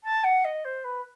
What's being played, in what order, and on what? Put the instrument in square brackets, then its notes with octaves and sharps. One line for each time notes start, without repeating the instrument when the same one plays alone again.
[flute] A5
F#5
D#5
C5
B4